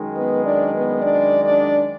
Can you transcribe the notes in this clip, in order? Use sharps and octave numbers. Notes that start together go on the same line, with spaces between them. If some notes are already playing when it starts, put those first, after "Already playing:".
Already playing: F#2 D#3 G#3
B3 B4
D4 D5
B3 B4
D4 D5
D4 D5